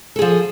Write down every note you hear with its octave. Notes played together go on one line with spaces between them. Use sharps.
F3 G#4 A4